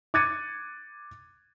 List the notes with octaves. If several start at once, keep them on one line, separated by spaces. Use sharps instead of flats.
D6 F#6 G#6 A6 C#7 D#7